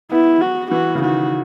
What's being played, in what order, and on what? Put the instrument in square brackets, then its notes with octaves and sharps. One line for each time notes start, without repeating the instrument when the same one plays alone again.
[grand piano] B3 [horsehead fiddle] E4
[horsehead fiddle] F#4
[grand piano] E3 [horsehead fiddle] F#4
[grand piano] C#3
[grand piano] D#3 [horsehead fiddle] F#4